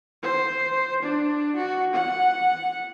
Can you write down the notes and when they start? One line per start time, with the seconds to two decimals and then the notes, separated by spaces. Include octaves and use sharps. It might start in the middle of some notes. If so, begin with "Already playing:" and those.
0.23 C5
1.02 D4
1.56 F#4
1.93 F#5